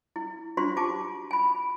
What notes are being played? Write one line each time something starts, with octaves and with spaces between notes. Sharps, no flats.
E4
D4 F4 F#4 C5 C6 C#6
F4 G4 G#5 A5 D6
G#5 B5